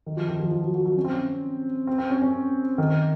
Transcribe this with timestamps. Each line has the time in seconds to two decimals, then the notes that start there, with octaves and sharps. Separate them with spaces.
0.06 D#3
0.17 F3
0.28 D#3
0.40 F3
0.51 F3
0.62 F#3
0.74 F#3
0.85 F#3
0.97 C#4
1.04 C4
1.13 C#4
1.87 C4
1.98 C4
2.10 C#4
2.22 C#4
2.78 D#3